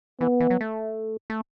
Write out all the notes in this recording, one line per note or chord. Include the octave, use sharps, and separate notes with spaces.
E3 B3
E3
F#3
A3
A3